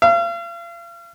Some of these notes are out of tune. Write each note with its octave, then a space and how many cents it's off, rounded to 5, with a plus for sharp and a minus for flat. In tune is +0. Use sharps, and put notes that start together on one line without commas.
F5 -40